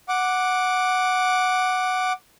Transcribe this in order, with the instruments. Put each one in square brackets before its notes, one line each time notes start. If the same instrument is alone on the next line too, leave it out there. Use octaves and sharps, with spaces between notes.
[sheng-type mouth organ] F#5 D6